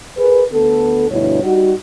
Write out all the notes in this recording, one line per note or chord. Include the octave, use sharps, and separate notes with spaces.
G#4 A#4 B4
D2 B3 A4
D2 G2 B2 E4 C#5
G3 D#4 F#4